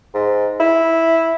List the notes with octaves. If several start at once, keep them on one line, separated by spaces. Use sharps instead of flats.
G#2
E4